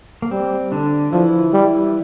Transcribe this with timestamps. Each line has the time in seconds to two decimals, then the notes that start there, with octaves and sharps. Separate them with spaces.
0.22 A#3
0.31 G3 C4
0.72 D3 D4
1.12 E3 F3 E4
1.53 G3